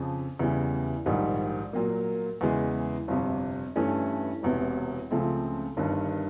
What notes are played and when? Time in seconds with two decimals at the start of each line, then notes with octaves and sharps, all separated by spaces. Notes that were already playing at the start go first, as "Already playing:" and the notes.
Already playing: F2 C#3 F3
0.39 E2 C#3 E3 G3
1.06 A#1 G#2 D#3 G3
1.73 A#2 F#3 A#3
2.41 E2 C#3 E3 G#3
3.08 G1 F2 C3
3.76 G2 E3 A3 C#4
4.43 E1 E2 C3
5.11 C#2 C#3 F3 A3 C4
5.77 G1 G2 D#3